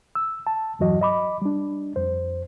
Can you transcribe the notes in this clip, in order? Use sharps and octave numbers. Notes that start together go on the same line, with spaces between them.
E6
A5
E2 G2 E3 F#3 F#4 D#5
D#5 B5 D6
G3 D4
F2 C5